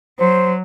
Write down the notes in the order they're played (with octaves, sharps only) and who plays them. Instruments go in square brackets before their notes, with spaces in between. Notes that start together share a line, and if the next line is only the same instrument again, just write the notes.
[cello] F#3 [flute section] C5